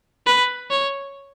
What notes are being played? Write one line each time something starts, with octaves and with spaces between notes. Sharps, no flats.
B4
C#5